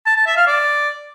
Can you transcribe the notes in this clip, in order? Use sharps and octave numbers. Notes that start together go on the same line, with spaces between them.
A5
A5
E5
F5
D5